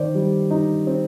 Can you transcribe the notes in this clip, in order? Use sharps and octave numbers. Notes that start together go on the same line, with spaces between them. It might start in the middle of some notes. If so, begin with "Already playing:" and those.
Already playing: D#3 C5 D5
G3
D#4
C4